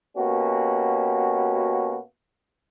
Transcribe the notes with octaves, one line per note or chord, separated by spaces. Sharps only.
B2 A#3 C#4 F#4 G4